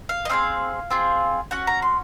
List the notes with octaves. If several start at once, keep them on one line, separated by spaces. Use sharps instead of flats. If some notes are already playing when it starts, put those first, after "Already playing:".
F5
D#5
C4 D#4 G#4 F5
C4 F4 G#4
C#4 F#4 F#5
A#5
C6